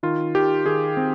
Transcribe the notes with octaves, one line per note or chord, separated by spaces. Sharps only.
D#3 F4
D#3 G4
D#3 G#4
C4